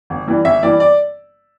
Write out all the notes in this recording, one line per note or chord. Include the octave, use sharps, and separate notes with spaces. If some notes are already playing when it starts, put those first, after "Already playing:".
G1
G2 E3 G3
G1 E5
G2 E3 G3 D5
D5